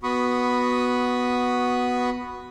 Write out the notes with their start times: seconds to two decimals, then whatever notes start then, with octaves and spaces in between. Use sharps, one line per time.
0.03 B3 F#4 B5 C#6 D#6